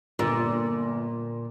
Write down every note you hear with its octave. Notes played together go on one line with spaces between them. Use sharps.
G1 A#2 A#5 E6